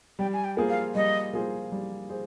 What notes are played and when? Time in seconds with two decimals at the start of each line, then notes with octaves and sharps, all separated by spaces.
0.19 G3 G5
0.33 G#5
0.44 G5
0.57 A#3 F4 G#4 C5
0.69 F5
0.95 G3 D#5
1.34 A#3 F4 G#4 C5
1.72 G3
2.09 G#4 C5